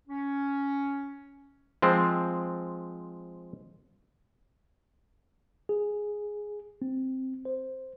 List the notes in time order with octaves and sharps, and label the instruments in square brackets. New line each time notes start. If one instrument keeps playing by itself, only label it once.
[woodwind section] C#4
[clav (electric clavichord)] F3 G#3 C4
[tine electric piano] G#4
C4
C5